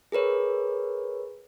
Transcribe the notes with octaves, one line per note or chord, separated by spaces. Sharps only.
G#4 A#4 B4 C#5